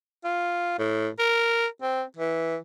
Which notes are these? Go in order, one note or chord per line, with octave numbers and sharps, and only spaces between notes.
F4
A2
A#4
C4
E3